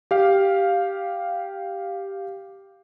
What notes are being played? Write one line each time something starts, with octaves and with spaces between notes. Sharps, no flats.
G4 F5